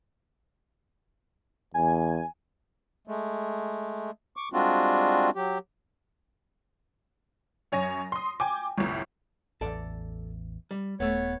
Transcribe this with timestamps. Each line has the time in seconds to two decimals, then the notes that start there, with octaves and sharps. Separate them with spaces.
1.74 E2 G#5
3.07 G#3 A3
4.36 C#6 D6
4.53 G3 G#3 C4 D4 F4 F#4
5.36 F#3 G4
7.72 F#2 C#5 G#5 A#6
8.12 C6 D#6
8.40 G5 G#5 D6
8.78 G1 C2
9.61 A1 E2 A4 D5
10.71 G3
11.00 D#1 A3 B3 C#5